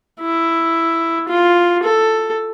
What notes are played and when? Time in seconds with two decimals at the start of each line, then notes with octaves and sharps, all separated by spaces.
0.20 E4
1.28 F4
1.83 A4